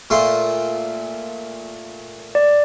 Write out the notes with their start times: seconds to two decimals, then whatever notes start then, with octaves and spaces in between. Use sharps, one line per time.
0.10 A#2 A3 C6
2.35 D5